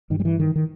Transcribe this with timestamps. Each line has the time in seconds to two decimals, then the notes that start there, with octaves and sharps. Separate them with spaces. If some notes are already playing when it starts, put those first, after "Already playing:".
0.10 G2 D#3
0.20 G3
0.25 E3
0.40 D#3
0.56 D#3